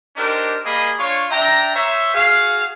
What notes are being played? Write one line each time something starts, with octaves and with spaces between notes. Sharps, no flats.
D4 D#4 G4 A#4 C5
G3 A#3 G#4 D#5 B5
D4 F4 C#5
D4 E5 G5 A#5
C5 C#5 E5
F#4 G#4 F5